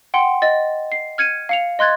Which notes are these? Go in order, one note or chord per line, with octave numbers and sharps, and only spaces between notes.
F#5 G5 C6
D#5 A6
C7
F6 G#6 C#7 D#7
F5 C#7 F7
D#5 C6 F#6 G#6 A6